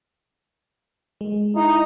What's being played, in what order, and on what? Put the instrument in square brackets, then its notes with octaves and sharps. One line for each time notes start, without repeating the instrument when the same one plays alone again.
[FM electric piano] G#3
[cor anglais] D#4 [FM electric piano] E4